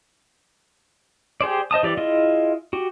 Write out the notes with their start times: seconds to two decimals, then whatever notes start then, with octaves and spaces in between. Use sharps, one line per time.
1.41 G4 G#4 C5 D5
1.71 C5 D#5 A5 D#6
1.83 E3 G4 D5
1.97 E4 F4 G#4 D#5
2.73 F#4 G4